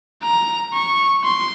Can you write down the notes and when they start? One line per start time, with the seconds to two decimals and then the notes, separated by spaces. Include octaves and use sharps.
0.23 A#5
0.73 C#6
1.24 C6